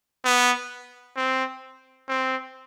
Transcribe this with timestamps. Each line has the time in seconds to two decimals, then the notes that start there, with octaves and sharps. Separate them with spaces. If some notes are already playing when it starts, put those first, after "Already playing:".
0.24 B3
1.16 C4
2.08 C4